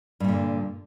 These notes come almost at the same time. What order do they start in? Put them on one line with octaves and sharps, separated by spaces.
G2 A#2 D3